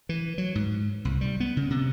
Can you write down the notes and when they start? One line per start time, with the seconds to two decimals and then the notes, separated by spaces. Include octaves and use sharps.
0.09 E3
0.38 F#3
0.55 G#2
1.05 C2
1.21 G3
1.40 B3
1.57 C#3
1.70 C3